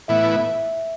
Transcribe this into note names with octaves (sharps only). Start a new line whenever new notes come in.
A2 E3 B3 E4 E5